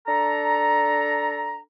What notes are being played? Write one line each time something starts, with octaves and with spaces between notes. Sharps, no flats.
D4 A4 A#5